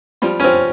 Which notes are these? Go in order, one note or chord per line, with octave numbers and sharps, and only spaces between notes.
F3 G3
C#4
F3 C4